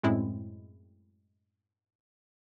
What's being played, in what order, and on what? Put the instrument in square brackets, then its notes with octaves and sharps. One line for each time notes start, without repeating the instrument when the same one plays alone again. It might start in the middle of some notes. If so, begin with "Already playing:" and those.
[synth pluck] F#2 A2 G#3 C4 E4